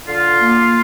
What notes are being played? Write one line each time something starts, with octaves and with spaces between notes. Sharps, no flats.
D3 F4
A#3